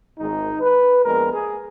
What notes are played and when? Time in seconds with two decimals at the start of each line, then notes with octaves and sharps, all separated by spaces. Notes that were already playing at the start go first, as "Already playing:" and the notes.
0.18 G#1 G#2 D#3 G#3 D#4
0.61 B4
1.04 A#1 A#2 G#3 B3 A#4
1.32 G#4